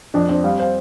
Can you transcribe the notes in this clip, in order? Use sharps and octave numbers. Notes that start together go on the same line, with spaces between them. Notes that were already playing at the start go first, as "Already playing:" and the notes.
F2 D4
C4 D4
G3 F5
C5 F5